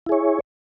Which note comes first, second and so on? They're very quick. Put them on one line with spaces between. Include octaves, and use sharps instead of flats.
E4 G#4 C#5